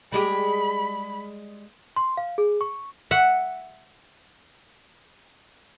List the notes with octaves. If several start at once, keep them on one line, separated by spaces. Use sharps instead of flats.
G3 G#3 G4 B5
C6
F5
G#4
C#6
E5 F#5